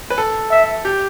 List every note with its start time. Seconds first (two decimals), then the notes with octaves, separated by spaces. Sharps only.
0.10 B4
0.18 A4
0.51 E5
0.85 G4